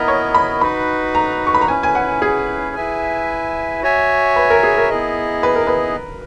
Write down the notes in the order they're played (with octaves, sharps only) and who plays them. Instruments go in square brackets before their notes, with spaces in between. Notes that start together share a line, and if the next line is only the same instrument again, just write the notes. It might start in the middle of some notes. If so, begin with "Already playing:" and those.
Already playing: [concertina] B3 E4 A#4 D#5 [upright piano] A#5
[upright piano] C#5
B5
[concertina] D#4 F#4 B4 [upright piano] B5
[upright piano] A#5
C#6
B5
A#5
[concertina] C#4 E4 B4 [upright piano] G#5
[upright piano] G#5
F#5
G#4
[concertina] E4 B4 E5 G#5
F#4 C#5 E5 G#5
[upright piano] B4
A#4
G#4
A#4
[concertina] B3 E4 G#4 D#5
[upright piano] B4
A#4
B4